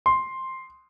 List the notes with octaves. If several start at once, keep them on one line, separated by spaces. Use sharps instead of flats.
C6